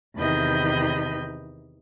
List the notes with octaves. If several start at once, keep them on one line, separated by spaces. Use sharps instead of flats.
E2 C3 D#3 D#5 B5 G6